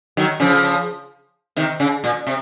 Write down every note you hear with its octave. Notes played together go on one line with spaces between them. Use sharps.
D#3 F#3
C#3 F3
C3 D#3
C#3
A#2
C3